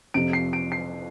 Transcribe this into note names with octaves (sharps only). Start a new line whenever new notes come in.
F2 C3 F3 D7
C7
D7
C7